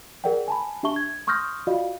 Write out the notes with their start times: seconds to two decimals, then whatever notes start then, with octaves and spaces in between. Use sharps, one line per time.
0.24 G#4 A#4 D5 F#5 G5
0.48 G#5 A5 B5
0.83 D4 G4 E5 A5 C#6 G7
0.96 G#6
1.27 C6 C#6 D#6 F6 G6 A#6
1.67 F4 F#4 D5 D#5 F5